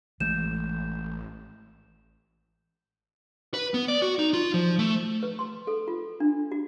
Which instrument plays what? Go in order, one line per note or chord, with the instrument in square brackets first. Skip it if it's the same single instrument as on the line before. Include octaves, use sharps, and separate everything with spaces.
[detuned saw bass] A1 [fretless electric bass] E3 G#3 A3 [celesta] G6 E7
[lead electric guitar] B4
B3
D5
F#4
D#4
F4
F3
A3
[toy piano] B4
C6
A4
F4
D4
F#4